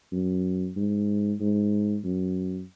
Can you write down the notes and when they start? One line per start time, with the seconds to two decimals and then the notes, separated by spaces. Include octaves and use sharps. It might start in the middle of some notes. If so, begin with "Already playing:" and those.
0.12 F#2
0.76 G#2
1.40 G#2
2.04 F#2